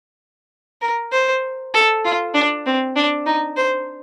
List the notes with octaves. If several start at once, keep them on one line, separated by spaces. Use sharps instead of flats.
A#4
C5
A4
F4
D4
C4
D4
D#4
C5